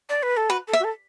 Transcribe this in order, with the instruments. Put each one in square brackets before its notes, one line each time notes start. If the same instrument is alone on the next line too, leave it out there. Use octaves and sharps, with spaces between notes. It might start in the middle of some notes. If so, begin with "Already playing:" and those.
[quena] D5
B4
A4
[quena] F#4 [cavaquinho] B4
[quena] A4
[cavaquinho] E5
[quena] F#4
A4